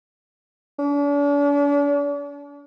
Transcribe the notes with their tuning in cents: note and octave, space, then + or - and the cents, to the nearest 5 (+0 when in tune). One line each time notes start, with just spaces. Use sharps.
D4 -45